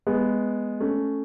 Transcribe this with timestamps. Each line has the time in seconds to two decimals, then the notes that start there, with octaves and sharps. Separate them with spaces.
0.07 G#3 B3
0.80 A3 C#4